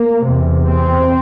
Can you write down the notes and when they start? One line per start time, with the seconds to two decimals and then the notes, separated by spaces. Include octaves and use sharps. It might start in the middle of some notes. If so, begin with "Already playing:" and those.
Already playing: A#3
0.25 E2 C3
0.68 C4